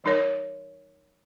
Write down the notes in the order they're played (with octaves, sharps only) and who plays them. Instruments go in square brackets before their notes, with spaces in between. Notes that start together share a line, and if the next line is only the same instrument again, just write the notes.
[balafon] E3 G3 D#4 A#4 C#5